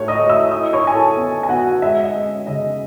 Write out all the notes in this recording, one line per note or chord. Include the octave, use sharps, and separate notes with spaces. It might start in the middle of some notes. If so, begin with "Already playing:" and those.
Already playing: A2 A3 C#5 C#6
D#5 D#6
A3
E5 E6
E4 D#5 D#6
C#5 C#6
E4 G#5
A4 A5
B3
G#5
B3 F#4 F#5
G#3 E5
D#5
C#4
C#3 D#5